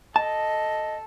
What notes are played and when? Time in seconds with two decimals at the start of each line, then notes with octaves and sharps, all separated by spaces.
0.16 A4 D#5 A5